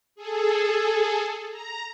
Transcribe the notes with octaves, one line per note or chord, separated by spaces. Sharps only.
G#4 A4
A#5